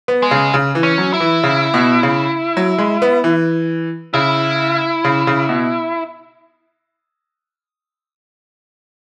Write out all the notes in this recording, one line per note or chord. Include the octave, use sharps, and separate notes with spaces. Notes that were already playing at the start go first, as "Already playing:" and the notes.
B3
G#3
C#3
C#3
E3
C#4
F#3
E4
E3
C#3
B2
C#3
F#3
G#3
B3
E3
C#3 E4
C#3
C#3
B2